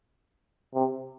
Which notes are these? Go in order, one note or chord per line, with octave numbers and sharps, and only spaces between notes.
C3